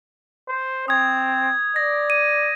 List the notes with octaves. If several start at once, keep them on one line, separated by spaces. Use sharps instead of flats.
C5
C4 D#6 G#6
D5 A#6
D#7